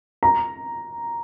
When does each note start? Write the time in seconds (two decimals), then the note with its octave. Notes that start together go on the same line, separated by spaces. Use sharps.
0.23 A#5